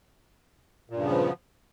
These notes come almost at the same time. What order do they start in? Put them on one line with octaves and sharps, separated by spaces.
A#2 G2 C#3 B3 F3